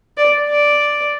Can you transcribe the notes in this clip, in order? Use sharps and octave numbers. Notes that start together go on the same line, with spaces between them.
D5
D5